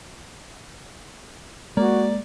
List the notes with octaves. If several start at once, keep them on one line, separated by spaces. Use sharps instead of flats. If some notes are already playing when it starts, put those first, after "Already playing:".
G#3 A#3 F#4 D5